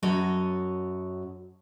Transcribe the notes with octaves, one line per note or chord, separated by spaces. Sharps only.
F#2 F#4 A4 C#5 D#5